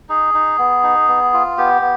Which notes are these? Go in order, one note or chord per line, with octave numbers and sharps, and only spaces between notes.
D#4 G#4
D#4
B3
D#4
B3
F4
B3 G4
B3